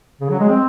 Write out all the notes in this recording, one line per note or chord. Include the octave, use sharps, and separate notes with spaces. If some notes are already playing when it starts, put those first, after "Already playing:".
C#3
F#3
G#3
C4